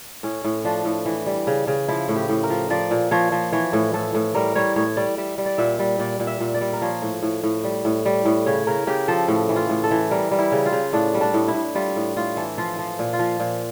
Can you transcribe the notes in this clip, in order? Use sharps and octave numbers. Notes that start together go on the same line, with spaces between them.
A2 C#4
A2
F3 D4
A2
E3
G3
C#3
C#3
F3 E4
A2
G4
A2
A#4
F3
F3 D5
A#2
F3 C#5
F3
E3 C#5
A2
A2 A4
A2
G3 A#4
G3 C#5
A2 C#5
G3 D5
G3 E5
G3
D5
A#2 E5
G3
A#2 D5
A#2
E5
A#2
D5
G3
A#4
F3 C#5
A2
A2
A2
G3
A2
G3
A2
C#3 C#5
C#3 A#4
C#3 G4
F3 A4
A2
E3
F4
A2
A4
E3
G3 A#4
G3
E4
C#3
F4
C#3
A2 D4
G3
D4
A2
E4
A2
G3 F4
A2
A2 F4
E3 A4
F3 F4
F3
A#2
F4
F3
A#2